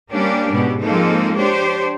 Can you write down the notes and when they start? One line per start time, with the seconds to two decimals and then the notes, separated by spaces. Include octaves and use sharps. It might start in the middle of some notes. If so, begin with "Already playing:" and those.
0.11 G3 A#3 C#4 D4 G4
0.51 G#2 B2 G4
0.80 F3 G#3 A#3 C4 D#4 A4
1.36 D4 G4 C5 C#5